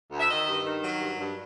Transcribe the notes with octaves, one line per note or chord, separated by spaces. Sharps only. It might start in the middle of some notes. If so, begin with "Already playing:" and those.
D2
E5
D#3 D#5
G2
D#3
F#3
G2
G2